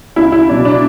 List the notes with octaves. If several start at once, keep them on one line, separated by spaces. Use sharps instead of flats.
C#2 E4
E4
B2 F#3 D4
D4